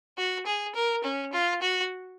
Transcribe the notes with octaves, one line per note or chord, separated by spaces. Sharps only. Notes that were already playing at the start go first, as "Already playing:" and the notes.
F#4
G#4
A#4
C#4
F4
F#4